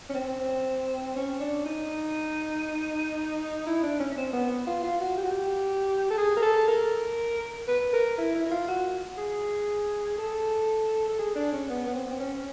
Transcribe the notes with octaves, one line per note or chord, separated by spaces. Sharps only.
C#4
C4
C#4
D4
D#4
E4
D4
C#4
C#4
C4
B3
B3
F4
F4
F#4
G4
F#4
G4
A4
G#4
A#4
A4
A#4
B4
A#4
E4
E4
E4
F4
F#4
G#4
A4
A4
G#4
D4
C#4
B3
B3
C4
C4
C#4